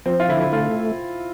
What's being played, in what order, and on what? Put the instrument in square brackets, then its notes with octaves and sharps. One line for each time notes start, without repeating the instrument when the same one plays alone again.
[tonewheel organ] F3 [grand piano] C4
[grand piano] F4
[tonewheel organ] D3 [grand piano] E4
[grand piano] E4
[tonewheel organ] A3 [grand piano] F4